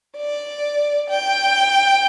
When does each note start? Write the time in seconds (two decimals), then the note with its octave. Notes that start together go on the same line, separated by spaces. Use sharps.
0.17 D5
1.10 G5